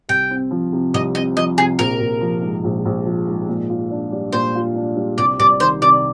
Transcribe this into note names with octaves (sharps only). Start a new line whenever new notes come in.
C2 G5
C4
F3
C3
C2 D#5
C4 D#5
F3 D#5
C3 G#4
A#1 A#4
A#1
F3
G#2
A#1
A#1
F3
G#2
A#2
F4
D4
G3
A#2 C5
F4
D4
G3
C2 D5
C2 D5
D#3 C5
C3 D5